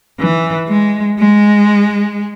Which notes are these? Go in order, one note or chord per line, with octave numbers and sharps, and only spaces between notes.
E3
G#3
G#3